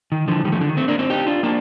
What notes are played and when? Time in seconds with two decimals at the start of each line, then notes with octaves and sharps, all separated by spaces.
0.12 D#3
0.28 D3 F3
0.45 D#3 G3
0.52 F3 A3
0.61 D3
0.69 D#3
0.77 A3 C4
0.88 A#3 D4
0.99 C4 D#4
1.10 D#4 G4
1.27 D4 F4
1.43 A#3 D4